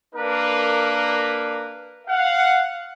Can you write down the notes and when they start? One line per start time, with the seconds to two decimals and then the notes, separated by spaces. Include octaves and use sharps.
0.14 A#3 D4 A#4 B4
2.07 F5 F#5